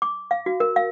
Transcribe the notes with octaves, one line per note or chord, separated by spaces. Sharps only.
D6
F5
F#4
A#4
F5